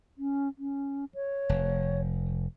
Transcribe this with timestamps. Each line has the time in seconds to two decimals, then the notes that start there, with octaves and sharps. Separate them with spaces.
0.18 C#4
0.59 C#4
1.15 C#5
1.49 F1